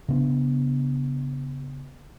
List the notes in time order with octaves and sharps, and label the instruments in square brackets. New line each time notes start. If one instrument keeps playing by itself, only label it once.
[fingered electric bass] C#3 B3 D4